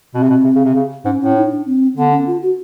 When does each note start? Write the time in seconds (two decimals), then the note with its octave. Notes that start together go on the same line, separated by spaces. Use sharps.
0.14 B2 C4
0.23 C3
0.30 B2
0.44 C3
0.55 C#3
0.65 C3
0.75 C#3
1.05 G#2 C#4
1.21 A2 C#4
1.36 D#4
1.46 D#4
1.51 D4
1.66 C4
1.97 D3 B3
2.12 C#4
2.27 F4
2.43 F#4